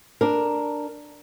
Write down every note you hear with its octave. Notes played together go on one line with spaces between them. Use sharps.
D4 A#4